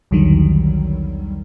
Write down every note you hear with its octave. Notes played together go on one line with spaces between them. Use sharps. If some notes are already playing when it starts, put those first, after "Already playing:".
B1 E2 D3 D#3 F#3 G3